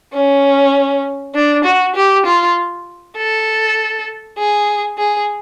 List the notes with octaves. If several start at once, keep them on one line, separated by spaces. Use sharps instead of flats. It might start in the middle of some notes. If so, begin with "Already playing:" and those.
C#4
D4
F#4
G4
F4
A4
G#4
G#4